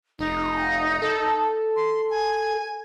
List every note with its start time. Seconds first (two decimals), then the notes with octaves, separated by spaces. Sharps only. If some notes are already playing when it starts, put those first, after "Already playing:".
0.19 F1 D#4
1.02 A4
1.76 C6
2.10 G#5